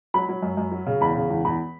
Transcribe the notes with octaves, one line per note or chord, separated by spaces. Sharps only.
F#3 B5
F#3
F#2
F#2
F#3
C#3
E2 B5
C#3
E2
E2 B5